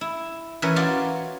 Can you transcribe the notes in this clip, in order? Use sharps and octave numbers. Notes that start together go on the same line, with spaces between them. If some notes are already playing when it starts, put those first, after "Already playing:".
E4
E3 C#4 A#4 B4 C#5
F4 F#4 C#5 D5 F5